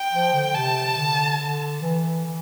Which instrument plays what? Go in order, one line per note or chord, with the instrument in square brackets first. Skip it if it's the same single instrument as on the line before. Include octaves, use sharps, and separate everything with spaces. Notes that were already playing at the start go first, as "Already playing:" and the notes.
Already playing: [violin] G5
[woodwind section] F3
D3
[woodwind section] C3 [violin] A5
[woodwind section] D3
D3
E3
E3